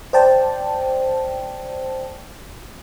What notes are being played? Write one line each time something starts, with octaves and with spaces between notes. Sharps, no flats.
C5 D5 G5 A5